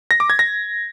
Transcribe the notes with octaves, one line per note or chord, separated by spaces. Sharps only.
A#6
D6
G#6
A#6